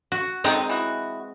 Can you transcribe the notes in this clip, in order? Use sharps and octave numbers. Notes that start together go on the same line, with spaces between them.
F#4
D3 D#3 G#3 C4 D#4 D#5
E3 F#4